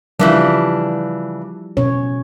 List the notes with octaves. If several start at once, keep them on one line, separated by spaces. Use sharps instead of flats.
C#3 E3 F3 G3 D4 E4
B2 C#4 C#5